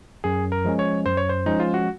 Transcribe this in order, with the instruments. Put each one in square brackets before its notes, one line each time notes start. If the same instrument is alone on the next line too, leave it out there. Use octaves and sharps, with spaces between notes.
[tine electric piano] F#2 [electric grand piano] G#4
[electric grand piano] A#4
[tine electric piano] F3 G#3 C#4
[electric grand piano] C#5
[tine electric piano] F#2 [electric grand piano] C5
[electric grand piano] C#5
C5
[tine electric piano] F3 G#3 C#4 [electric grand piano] D#4
[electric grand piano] F4
F#4